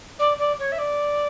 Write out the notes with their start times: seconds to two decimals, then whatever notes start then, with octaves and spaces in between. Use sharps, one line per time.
0.19 D5
0.39 D5
0.59 C#5
0.72 E5
0.79 D5